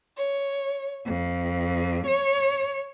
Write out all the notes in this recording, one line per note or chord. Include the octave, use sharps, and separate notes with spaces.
C#5
F2
C#5